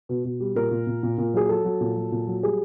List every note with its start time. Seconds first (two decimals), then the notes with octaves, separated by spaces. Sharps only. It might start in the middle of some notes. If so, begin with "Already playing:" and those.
0.09 B2
0.24 B2
0.40 G3
0.56 A#2 A#4
0.71 A#2
0.87 A#2
1.03 A#2
1.18 A#2
1.34 F#3 G#4
1.49 F#3 A4
1.64 F#3
1.81 A#2
1.96 F#3
2.12 A#2
2.27 F#3
2.42 G3 G#4